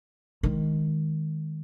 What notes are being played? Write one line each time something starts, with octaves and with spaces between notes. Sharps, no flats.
D#3 G#3